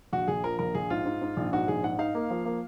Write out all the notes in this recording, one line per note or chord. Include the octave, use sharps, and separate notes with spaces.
A#1 F#4
A#1 G#4
F3 A#4
A#1 A#4
A#1 G#4
G#2 F4
G#2
G#2
A#1
G#2 F#4
A#1 G#4
G#2 F#5
D#4 F5
A#3
F3
A#3